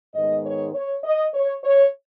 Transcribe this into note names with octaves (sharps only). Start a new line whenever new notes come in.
G#2 D#3 G#3 B3 D#5
C#5
C#5
D#5
C#5
C#5